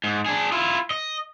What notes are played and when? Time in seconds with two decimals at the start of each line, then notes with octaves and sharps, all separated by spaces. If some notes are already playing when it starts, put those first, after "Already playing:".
0.04 G#2
0.26 D4 G#4
0.52 E4 F4
0.91 D#5